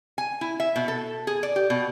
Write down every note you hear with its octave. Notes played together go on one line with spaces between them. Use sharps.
G#5
E4
E5
B2
A4
G#4
D5
G4
B2